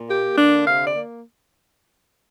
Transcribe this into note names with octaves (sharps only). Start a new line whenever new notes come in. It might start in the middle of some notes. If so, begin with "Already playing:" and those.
Already playing: A#2
A#3 G4
D3 D4
C3 F5
D5
A#3